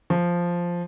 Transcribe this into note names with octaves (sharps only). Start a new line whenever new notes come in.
F3